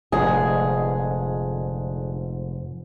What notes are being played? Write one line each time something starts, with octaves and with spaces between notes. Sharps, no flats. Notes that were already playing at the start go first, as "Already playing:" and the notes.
F1 F2 G#2 D3 G#4